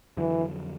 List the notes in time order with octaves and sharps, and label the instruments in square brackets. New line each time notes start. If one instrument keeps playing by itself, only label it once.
[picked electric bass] F2 D3 F#3 [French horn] E3